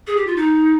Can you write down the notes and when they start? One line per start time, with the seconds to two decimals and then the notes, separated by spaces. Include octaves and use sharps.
0.07 G#4
0.17 G4
0.27 F4
0.36 D#4